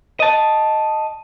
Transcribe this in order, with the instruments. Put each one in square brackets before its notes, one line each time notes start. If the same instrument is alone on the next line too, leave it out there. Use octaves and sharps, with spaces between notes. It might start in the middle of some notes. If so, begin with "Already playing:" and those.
[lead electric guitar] D#5 A5